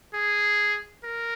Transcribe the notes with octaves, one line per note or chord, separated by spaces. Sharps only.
G#4
A#4